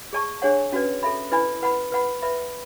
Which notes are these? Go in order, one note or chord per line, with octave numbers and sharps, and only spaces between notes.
G#4 D5 A5 C#6
D4 G#4 C#5 F#5
C#4 F#4 B4 D5
A4 E5 B5
E4 B4 D5 G#5 B5
B4 F#5 B5
B4 F#5 B5
B4 E5 B5